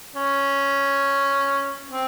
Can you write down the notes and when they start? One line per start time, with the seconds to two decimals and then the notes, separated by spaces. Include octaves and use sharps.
0.15 C#4
1.91 C4